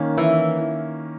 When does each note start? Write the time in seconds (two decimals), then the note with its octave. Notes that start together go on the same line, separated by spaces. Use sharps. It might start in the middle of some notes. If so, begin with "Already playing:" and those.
Already playing: D#3 A#3 C#4
0.18 E3